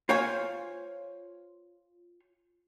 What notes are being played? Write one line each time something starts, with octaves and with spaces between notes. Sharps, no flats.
F4 C5 C#5 F5 G#5